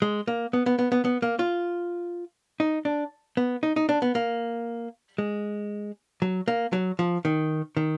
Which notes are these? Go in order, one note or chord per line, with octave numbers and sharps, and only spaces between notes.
G#3
A#3
B3
B3
B3
B3
B3
A#3
F4
D#4
D4
B3
D#4
D#4
D4
B3
A#3
G#3
F#3
A#3
F#3
F3
D#3
D#3